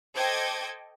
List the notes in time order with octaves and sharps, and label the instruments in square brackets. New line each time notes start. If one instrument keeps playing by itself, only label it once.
[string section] A4 C5 D#5 G5 D6 G#6